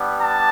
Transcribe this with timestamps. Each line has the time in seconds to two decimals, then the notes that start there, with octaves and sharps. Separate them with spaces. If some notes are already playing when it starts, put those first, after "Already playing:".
Already playing: G3 B3 D4
0.20 A5